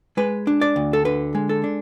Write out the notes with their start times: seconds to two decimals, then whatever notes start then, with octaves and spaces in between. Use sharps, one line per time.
0.17 G#3 B4
0.47 D4
0.61 D5
0.76 D2
0.93 A4
1.05 D3 B4
1.35 G#3
1.49 A4
1.64 D4